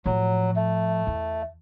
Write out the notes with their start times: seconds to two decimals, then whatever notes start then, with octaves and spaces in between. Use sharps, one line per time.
0.06 A2 F3 F#3
0.56 A3
1.07 E2